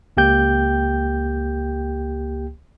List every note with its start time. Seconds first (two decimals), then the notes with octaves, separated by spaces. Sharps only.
0.17 C#2 A#3 G4 G5 G6